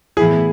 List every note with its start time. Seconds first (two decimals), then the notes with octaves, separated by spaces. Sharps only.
0.17 A2 E3 B3 E4 G#4